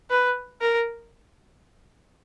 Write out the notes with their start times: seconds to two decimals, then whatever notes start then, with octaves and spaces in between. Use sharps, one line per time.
0.10 B4
0.61 A#4